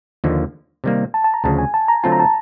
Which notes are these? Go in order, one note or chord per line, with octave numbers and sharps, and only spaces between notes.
D#2 D3 F3 A#3
C3 D#3 G3 A#3
A5
A5
A#5
D2 C#3 F3 A5
G#5
A5
A#5
D3 F#3 A3 C4 F4 A5
A#5
A5